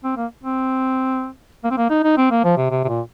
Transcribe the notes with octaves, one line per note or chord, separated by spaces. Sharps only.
C4
A#3
C4
A#3
C4
A#3
D#4
D#4
C4
A#3
F3
C3
C3
C3
A#2